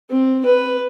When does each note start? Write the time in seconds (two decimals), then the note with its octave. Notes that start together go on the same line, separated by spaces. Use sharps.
0.10 C4
0.46 B4